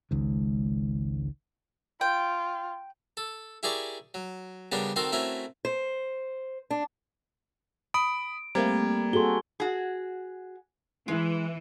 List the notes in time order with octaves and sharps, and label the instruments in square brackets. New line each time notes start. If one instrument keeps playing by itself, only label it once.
[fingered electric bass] G#1 C#2 G#2
[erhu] F4 [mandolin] G5
[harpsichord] A4
E4 G4 G#4 A#4 D5 C#6
F#3
C#3 G3 B3 D4 A#4
D#3 C4 F#4 A4 A#4 C5
A3 C4 C#4 E4 F#4 A#4
[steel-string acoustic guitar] C5
D4
[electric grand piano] B5 D#6 [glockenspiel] D7
[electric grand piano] G3 [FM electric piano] A3 A#3 C4 [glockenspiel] A#5 G#6
[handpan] F#4 G#4 A4 [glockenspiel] C6 G7
[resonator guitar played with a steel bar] F#4 G#4
[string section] E3 [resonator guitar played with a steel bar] G#3